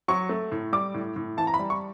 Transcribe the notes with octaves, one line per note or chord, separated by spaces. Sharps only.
F#3 C#6
A3
A2
G3 D6
A2
A2
E3 A5
A#5
B5
G3
C#6